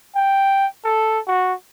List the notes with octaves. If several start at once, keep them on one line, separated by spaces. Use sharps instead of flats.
G5
A4
F#4